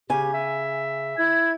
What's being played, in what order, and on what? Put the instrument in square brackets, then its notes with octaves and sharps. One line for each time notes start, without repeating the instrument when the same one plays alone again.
[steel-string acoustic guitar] C#3 G#5 [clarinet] G4
[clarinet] E5
[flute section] E4 G#6